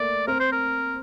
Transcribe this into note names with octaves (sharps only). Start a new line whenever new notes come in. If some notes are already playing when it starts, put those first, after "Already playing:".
Already playing: A3 A#3 D5
C4 A#4
C5
A#4